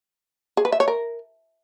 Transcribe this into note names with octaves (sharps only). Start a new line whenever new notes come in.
G#4
B4
E5
C#5
A#4